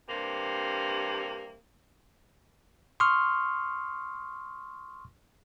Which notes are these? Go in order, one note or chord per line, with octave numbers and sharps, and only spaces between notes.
G2 C3 A#3
C6 C#6 D#6 F6